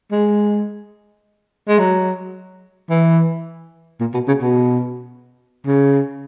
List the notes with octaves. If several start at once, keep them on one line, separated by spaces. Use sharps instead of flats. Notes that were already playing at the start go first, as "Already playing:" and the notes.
G#3
G#3
F#3
E3
A#2
B2
C#3
B2
C#3